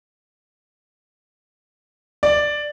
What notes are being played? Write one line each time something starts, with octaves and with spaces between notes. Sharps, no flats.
D5